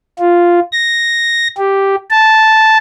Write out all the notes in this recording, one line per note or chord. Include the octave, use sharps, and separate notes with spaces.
F4
A#6
G4
A5